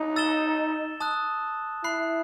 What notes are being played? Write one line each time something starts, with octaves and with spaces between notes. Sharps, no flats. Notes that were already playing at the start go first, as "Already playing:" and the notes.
Already playing: D#4
E6 A6 E7 G7
A5 D#6 F#6
E4 B5 F#6 C7